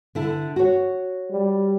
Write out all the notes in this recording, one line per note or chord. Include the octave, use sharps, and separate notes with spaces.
D3 E4
F#4 C#5
G3